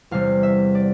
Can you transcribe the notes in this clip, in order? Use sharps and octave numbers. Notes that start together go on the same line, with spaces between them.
E2 C3 G3 F5
E5
D5